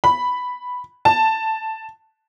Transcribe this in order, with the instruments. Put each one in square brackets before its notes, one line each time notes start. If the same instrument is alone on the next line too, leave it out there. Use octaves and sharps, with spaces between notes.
[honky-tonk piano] B5
A5